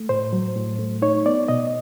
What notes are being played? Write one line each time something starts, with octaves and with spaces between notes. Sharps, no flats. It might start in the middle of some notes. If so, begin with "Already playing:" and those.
Already playing: A3
A2 C5
F#3
A2
A3
D#4 C#5
B3 D5
B2 D#5